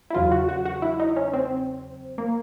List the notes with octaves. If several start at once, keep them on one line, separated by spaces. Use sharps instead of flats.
E4
E2 C#3 F#3 F4
F#4
F#4
F#4
E4
D#4
C#4
C4
A#3